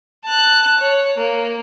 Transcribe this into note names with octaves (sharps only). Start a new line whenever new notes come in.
A5 F#6
C#5
A#3